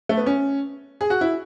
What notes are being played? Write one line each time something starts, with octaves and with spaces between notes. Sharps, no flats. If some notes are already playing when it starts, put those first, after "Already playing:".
A3
B3
C#4
G#4
F#4
E4